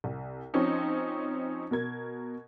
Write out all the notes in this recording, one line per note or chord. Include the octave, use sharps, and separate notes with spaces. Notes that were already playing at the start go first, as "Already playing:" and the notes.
C2
F3 C4 C#4 D#4
B2 A#4 G#6